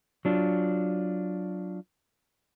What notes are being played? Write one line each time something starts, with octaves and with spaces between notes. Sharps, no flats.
F#3 D4 F4